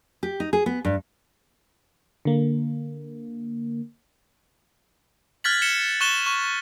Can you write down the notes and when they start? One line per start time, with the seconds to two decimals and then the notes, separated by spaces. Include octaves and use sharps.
0.23 G4
0.40 D#4
0.53 G#4
0.66 B3
0.85 G2
2.25 D3 A#3
5.44 F6 F#6 G#6 A6 B6 F#7
5.62 C#7 E7 G7
6.01 C#6 F#6 E7 G7
6.26 C#6